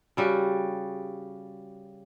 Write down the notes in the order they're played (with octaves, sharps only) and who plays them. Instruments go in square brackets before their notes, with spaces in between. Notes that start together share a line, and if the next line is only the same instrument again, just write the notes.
[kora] C#3 G3 F#4